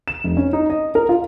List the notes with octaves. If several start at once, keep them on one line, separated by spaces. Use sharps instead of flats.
E7
F1
C#4
D#4
D#5
A#4
F4